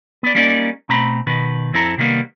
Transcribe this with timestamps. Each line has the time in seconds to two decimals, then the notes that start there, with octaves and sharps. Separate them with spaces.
0.23 B3 D5
0.35 G3 A#3 C#4 D#4 A#4 D5
0.89 B2 A3 C4 A#5 B5
1.27 B2 D#3 B4
1.73 F2 C4 E4 A4 A#5
1.98 C3 D#3 G3 A#3 B3